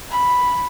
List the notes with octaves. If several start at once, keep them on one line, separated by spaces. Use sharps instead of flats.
B5